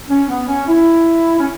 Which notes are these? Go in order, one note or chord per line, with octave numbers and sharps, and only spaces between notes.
C#4
B3
C#4
E4
C#4